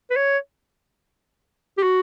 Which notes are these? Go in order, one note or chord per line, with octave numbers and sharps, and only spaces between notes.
B4
C#5
G4
F#4